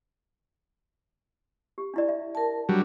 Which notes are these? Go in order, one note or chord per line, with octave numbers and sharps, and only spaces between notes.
G4
D4 E4 D5
E5
A#4 A5
F#3 G3 D4